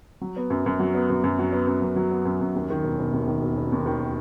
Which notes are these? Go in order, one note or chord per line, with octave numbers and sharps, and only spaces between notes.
F#3
B3
F#2
F#2
F#3
B3
F#2
F#2
F#3
B3
F#2
F#2
F#3
B3
F#2
F#2
D#2
D#3
E1
E1
D#2
D#3
E1
E1
D#2
D#3